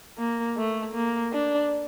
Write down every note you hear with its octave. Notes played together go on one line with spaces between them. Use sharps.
A#3
A3
A#3
D4